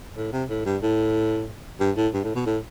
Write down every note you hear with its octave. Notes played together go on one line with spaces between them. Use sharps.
A2
C3
A2
G2
A2
G2
A2
G2
A2
B2
A2